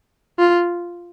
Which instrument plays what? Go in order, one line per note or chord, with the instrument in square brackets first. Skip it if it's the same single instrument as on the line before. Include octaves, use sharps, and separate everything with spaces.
[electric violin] F4